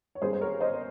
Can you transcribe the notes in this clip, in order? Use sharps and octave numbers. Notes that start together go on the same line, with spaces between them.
C#5
G2 G3 A#3 C#4 G#4 C5
C5
A#4 C#5
C5 D#5